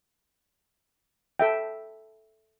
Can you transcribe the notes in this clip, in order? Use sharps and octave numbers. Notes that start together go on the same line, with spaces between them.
A4 E5 G5